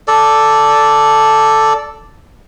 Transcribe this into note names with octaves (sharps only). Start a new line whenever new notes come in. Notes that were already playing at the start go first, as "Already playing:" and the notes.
A4 D5